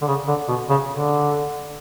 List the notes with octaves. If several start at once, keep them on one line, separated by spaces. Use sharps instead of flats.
D3
C#3
D3
B2
C#3
D3